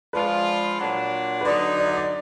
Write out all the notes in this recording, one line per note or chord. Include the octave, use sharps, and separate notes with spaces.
F3 G#3 D4 F4 B4
A#2 F#3 D4
B4
D3 F#3 B3 D#4 D5
D5
D#5
D5